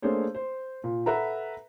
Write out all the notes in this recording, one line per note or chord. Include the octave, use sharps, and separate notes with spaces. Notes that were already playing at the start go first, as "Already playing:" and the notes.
A3 A#3 D4 G#4 C5 C#5
C5
A#2
A4 B4 E5 F#5 A#5